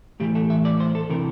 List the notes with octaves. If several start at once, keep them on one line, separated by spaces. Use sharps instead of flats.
A2 E3 G4
A4
E5
D5
C5
A4
C3 E3 A#4